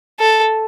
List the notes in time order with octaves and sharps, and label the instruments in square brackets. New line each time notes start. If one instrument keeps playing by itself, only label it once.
[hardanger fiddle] A4